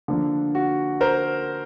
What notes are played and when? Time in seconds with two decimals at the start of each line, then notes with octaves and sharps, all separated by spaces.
0.08 D3 F3 A#3 D4
0.55 F#4
1.01 A#4 C5